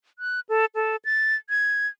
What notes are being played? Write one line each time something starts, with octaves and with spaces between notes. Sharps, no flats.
F#6
A4
A4
A6
G#6